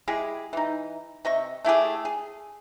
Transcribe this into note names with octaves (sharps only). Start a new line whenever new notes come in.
G#3 E4 G4 G#4
E3 D#4
C3 D#5 E5 C#6
A3 E4 G4 G#4
G#4